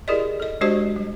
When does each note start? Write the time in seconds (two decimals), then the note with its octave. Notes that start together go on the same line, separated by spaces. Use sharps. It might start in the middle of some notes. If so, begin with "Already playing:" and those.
0.08 E4 G4 G#4 A#4 D5 D#5
0.40 A4 D#5
0.61 G#3 D4 F#4 G4 C5 D#5
0.96 G3